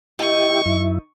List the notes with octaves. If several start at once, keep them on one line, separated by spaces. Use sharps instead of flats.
D#3 E4 G4 D#5 C#6
F#2 E4